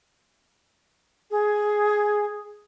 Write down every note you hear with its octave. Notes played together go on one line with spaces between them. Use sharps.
G#4